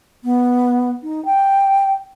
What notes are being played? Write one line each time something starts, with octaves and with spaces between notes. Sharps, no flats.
B3
D#4
G5